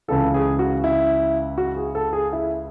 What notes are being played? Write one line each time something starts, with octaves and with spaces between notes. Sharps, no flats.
C#2 C#3 E3 A4
G#4
F#4
E4
F#4
G#4
A4
G#4
E4